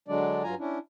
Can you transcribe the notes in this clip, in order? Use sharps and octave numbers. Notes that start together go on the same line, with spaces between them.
D3 F#3 G#3 D4 D5
G2 F#3 F4 G#5 A#5
C#4 D4 E4